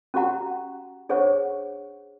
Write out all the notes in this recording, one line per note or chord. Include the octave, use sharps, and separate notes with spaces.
C#4 F#4 G4 F#5 A#5
D4 G#4 C5 C#5 F#5 C#6